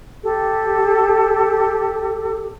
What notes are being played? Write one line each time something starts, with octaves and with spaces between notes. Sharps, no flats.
G4 A4